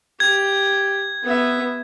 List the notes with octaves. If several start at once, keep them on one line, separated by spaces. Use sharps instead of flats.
G4 G#6
B3 E5